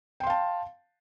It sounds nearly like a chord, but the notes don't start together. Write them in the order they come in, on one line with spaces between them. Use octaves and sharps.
G5 C6 F5 A5